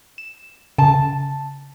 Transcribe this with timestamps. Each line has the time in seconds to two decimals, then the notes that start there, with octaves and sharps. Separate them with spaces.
0.18 E7
0.78 C#3 A5